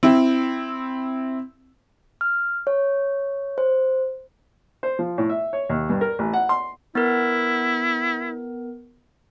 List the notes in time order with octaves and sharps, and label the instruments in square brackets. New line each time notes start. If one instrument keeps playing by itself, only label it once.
[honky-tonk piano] C4 E4
[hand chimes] F6
C#5
C5
[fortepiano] C5
F3
A2
E5
C#5
D#2
G2
A#4
A1
F#5
C6
[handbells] B3 A#4 [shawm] E4